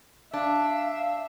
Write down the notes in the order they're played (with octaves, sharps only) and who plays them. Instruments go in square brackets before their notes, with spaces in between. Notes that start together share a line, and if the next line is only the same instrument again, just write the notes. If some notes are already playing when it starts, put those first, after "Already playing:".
[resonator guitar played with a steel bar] D4 [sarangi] E5 [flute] F5